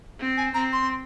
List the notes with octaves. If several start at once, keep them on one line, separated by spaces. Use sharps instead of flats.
C4
G#5
C4 A#5
C6